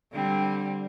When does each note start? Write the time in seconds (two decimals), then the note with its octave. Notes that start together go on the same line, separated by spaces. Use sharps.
0.12 D3 G3 C4